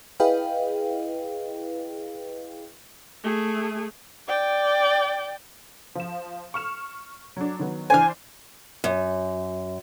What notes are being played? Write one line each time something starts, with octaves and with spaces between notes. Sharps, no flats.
E4 G#4 B4 D#5 F5 G5
A3 G#4
D5 G5
F3 E7
C#6 F6 E7
F#3 D4
D#3 F#3 B3
E3 D4 C5 G#5 F6
F#2